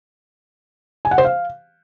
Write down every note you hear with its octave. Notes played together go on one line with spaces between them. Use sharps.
G#5
F#5
C5
F5